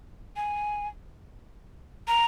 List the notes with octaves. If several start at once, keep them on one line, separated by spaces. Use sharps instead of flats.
G#5
A#5